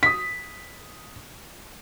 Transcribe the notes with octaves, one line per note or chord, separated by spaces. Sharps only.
D#6 B6